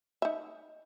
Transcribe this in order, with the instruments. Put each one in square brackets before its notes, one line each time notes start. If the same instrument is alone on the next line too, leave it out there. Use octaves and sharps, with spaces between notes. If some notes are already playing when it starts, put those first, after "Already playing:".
[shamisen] D#4 E5